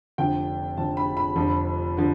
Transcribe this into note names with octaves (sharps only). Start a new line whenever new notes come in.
F1 F2 D3 F3 G5
F1 F2 D3 F3 A5
B5
B5
F1 F2 D3 F3
D3 F3